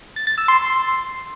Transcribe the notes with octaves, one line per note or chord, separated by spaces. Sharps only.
A6
A6
E6
C6